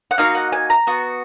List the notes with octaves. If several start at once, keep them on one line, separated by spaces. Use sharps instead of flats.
F#5
A#3 D#4 F#4 F5
F#5
G#5
A#5
B3 F#4